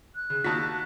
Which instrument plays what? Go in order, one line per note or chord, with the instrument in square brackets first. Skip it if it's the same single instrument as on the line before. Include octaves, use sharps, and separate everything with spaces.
[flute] F#6
[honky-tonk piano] C#3
[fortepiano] D#2 F#4 [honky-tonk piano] A5 B6